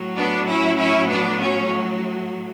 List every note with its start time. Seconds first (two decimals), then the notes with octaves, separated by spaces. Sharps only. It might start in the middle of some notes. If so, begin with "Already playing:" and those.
Already playing: A2 F#3
0.16 B3 D4
0.47 C#4 E4
0.78 C#4 E4
1.09 B3 D4
1.41 C#4